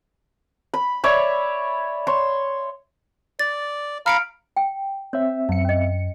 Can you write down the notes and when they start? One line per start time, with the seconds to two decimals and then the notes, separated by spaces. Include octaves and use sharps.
0.74 B5
1.04 C#5 D5 E5 B5
2.07 C#5 C6
3.39 D5 A6
4.06 F5 A#5 B5 F6 C#7 D7
4.57 G5
5.13 C4 C#5 E5
5.49 F#2 C#7
5.65 C#4 D#5